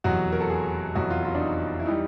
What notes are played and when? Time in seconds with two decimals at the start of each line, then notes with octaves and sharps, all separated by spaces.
0.04 F1 E2 B2 F#3 F#4
0.32 A#4
0.41 A4
0.50 G#4
0.95 F1 E2 B2 F#3 F#4
1.10 F4
1.25 F4
1.34 D4
1.40 D#4
1.79 E4
1.86 E3 G3 D#4